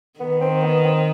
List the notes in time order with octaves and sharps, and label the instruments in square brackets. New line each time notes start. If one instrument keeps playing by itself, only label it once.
[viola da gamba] D#3 [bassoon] B3
[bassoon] C4
B3
C4